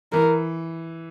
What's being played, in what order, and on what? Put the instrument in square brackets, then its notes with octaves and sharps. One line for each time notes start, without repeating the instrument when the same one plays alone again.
[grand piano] E3 [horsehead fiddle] A#4